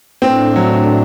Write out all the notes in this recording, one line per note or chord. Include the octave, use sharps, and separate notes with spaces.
A2 A3 C4 D4
F#3